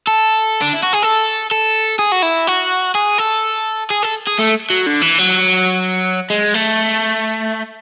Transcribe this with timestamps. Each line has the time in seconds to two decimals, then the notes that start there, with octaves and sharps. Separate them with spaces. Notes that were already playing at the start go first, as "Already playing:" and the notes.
0.07 A4
0.61 D4
0.73 E4
0.83 F#4
0.93 G#4
1.02 A4
1.51 A4
1.99 G#4
2.12 F#4
2.22 E4
2.47 F#4
2.95 G#4
3.18 A4
3.90 G#4
4.03 A4
4.27 G#4
4.39 A3
4.70 F#3
4.86 D3
5.02 E3
5.19 F#3
6.30 G#3
6.54 A3